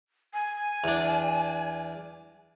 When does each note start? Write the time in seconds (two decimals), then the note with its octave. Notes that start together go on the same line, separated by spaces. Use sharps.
0.34 G#5
0.84 E2 D4